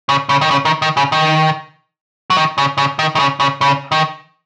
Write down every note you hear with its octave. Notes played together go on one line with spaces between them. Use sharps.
C#3
C#3
D#3
C#3
D#3
D#3
C#3
D#3
F#3
D#3
C#3
C#3
D#3
D#3
C#3
C#3
C#3
D#3